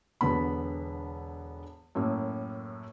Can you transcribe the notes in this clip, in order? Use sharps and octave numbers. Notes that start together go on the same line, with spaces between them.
E1 D3 B3 B5
F#2 A2 A#3